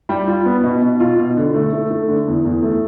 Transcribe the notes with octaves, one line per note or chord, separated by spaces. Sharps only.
G3
F4
B3
B2
B2
F4
B2
D3
A3
A3
A3
D3
E2
E2
A3